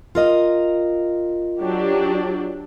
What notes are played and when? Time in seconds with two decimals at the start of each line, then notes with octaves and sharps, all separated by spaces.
0.15 F4 A#4 D#5
1.60 F#3 D4 G4